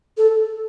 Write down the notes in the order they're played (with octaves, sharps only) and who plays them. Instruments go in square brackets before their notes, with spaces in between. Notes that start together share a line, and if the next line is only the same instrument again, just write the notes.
[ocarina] A4